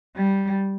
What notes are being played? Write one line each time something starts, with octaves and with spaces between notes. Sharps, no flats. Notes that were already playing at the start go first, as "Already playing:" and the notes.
G3